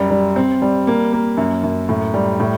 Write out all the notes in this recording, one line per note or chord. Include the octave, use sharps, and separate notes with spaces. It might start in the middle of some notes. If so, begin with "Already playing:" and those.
Already playing: F#2 G3
G3
C4
G3
A#3
A#3
F#2
F#2
A2
G3
A2